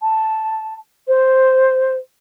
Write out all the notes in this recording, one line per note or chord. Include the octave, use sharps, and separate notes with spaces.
A5
C5